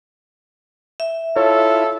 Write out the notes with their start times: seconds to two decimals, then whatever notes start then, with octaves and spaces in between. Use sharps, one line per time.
1.00 E5
1.36 E4 F4 A4 C#5